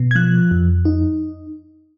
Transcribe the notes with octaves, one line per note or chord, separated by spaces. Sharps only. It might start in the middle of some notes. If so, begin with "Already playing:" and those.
Already playing: B2
G#6
F3 F#6
F2
D#4